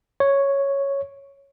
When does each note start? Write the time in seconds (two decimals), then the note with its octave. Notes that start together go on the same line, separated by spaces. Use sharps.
0.20 C#5